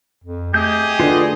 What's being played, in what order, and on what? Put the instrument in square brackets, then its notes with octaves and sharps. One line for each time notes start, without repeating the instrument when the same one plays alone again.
[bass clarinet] F2
[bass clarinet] A3 [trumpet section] G4 G#4 D#5 [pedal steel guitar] G6
[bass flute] D3 [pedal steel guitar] F4 B4